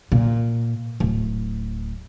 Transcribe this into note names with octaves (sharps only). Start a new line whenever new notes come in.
A#2
D1